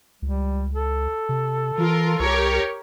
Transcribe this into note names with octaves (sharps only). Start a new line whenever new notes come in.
C#2 G3
A4
C3
E3 F4 A#4
C2 G4 A#4 C#5